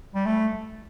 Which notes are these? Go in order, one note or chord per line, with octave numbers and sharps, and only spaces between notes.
G3
A3